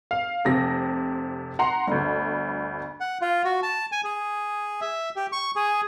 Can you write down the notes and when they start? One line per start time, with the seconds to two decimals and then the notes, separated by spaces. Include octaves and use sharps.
0.11 F5
0.45 F1 C3 A#6
1.59 F#5 A#5 C6
1.87 G1 D2
3.00 F#5
3.22 F4
3.45 F#4
3.63 A5
3.92 G#5
4.04 G#4
4.81 E5
5.16 G4
5.32 C#6
5.56 G#4